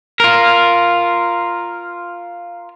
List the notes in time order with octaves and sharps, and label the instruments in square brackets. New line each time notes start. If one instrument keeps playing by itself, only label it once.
[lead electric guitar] F4 A#4